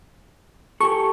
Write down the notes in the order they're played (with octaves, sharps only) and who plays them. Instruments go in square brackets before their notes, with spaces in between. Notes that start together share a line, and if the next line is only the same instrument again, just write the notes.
[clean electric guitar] G4 A4 [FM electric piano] C#6